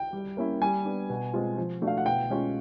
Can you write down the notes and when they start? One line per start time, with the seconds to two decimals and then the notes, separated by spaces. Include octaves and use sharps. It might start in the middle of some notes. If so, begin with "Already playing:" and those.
Already playing: G5
0.13 G3
0.37 A#3 C#4 E4
0.61 G3 G#5
0.85 B3 D4
1.10 B2
1.34 G#3 C4 F4
1.57 F3
1.82 A3 D4 F#4
1.87 F5
1.98 F#5
2.06 B2 G5
2.30 G#3 C#4 F4